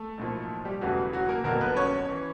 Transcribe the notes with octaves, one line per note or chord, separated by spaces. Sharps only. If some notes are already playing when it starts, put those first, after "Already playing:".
Already playing: A3 A4
B1 A2 F3 A#3
G3 G4
E1 E2 C#3 E3 F#3 A3 F#4
F#3 F#4
A#3 A#4
G1 F2 D3 F#3 A#3 B3 A#4
B3 B4
C#4 C#5
E3